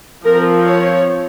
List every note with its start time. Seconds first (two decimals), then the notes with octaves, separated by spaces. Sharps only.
0.24 F3 C4 A#4
0.64 C#5